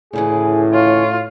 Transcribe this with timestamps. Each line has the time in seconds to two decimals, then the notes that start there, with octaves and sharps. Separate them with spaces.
0.13 D2 A2 C#3 E3 G#4
0.73 F4 C#5